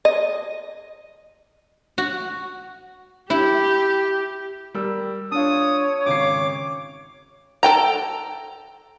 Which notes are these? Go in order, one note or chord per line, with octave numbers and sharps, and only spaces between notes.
D#5
F#4
E4 G4
G3 A#4 E6
D4 F4 C#5 D#6
G#1 C#3 D6 C7
A4 G5 A#5